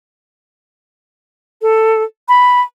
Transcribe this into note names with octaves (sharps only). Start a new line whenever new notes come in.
A4
B5